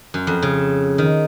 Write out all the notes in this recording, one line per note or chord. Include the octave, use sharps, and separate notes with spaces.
F#2
F2
C#3
D#3